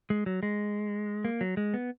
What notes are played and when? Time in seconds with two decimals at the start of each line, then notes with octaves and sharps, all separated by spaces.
0.10 G#3
0.26 F#3
0.43 G#3
1.25 A#3
1.41 F#3
1.57 G#3
1.74 B3